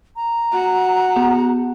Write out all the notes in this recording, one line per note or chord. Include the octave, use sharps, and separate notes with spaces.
A#5
F#4
B3 F#5